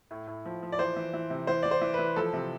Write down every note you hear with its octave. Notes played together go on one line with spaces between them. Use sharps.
A2
A2
F3
F3
D5
E3 C5
E3
E3
C3
E3 C5
E3 D5
C5
E3
E3 B4
F3 A4
C3